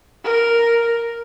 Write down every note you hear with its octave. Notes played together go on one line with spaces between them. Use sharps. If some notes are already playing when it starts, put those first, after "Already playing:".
A#4